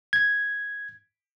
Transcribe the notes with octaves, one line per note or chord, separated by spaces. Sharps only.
G#6